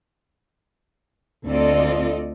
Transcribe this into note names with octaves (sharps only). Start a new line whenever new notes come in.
D2 C4 F4 A4 D5 D#5